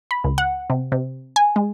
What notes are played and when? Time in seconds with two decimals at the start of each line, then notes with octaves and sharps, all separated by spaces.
0.11 B5
0.24 C#2
0.38 F#5
0.70 C3
0.92 C3
1.36 G#5
1.56 G#3